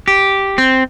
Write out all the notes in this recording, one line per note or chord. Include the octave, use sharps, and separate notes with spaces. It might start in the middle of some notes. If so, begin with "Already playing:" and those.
G4
C4